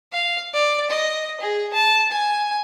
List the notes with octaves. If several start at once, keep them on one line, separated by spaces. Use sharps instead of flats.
F5
D5
D#5
G#4
A5
G#5